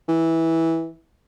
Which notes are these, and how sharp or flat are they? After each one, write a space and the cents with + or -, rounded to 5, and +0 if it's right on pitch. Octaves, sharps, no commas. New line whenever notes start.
E3 -10